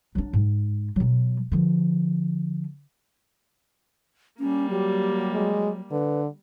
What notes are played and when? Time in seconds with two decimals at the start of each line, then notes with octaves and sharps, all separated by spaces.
0.15 F#3 D4
0.33 G#2
0.96 B2 F#3
1.52 D3 F3
4.39 G3 A#3 C#4
4.70 F#3 G4
5.33 G#3
5.92 D3 B4